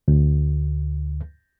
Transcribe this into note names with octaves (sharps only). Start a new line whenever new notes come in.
D2